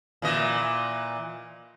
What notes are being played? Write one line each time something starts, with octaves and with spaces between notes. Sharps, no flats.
A#2 E3 D#5